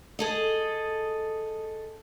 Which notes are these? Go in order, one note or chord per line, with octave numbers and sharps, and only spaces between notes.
G#4 A4 D#5